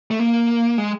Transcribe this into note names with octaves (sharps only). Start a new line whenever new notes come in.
A3
A#3
G#3